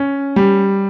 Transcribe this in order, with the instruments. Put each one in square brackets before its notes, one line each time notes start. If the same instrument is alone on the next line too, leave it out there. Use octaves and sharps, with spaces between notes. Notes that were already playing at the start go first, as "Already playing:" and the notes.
Already playing: [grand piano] C#4
G3